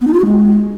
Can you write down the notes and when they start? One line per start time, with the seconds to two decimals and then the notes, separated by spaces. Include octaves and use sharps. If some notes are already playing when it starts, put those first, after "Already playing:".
0.01 B3
0.07 D#4
0.13 F4
0.19 F#4
0.25 G#3